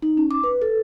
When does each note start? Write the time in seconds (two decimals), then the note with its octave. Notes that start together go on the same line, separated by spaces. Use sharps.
0.02 D#4
0.17 C#4
0.31 D6
0.44 B4
0.62 A4